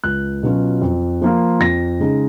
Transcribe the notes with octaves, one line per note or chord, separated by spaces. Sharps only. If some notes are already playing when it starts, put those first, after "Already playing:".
C#2 F#6
B2 F#3 C#4 F4
F2
F3 A#3 F4
F2 A#6
C#3 G#3 D#4